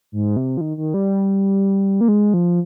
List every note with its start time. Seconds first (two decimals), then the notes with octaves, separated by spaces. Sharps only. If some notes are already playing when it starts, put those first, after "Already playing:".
0.12 G#2
0.36 C3
0.57 F3
0.61 D#3
0.77 D#3
0.94 G3
2.01 A#3
2.08 G#3
2.34 F3